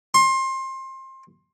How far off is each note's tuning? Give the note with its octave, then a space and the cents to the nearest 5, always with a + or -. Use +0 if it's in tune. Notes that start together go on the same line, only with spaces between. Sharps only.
C6 +25